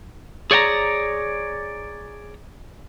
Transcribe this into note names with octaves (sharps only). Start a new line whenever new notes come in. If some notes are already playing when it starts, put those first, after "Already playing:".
G#4 C#5 D5 G5 A#5